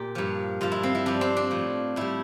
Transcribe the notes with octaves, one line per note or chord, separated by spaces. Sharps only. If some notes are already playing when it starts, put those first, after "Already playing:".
Already playing: A#2 G4
G2 F3
G2 F3 F4
E4
C4
E4
G2 F3 D4
C4
D4
A2 F3
A2 G3 E4